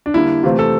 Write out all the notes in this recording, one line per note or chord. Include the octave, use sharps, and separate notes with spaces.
D4
D3 G3 A#3 E4
C3 E3 A3 C4 F4
A4